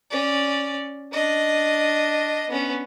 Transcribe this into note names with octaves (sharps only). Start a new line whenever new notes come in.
C#4 D5
D4 D#5
B3 C#4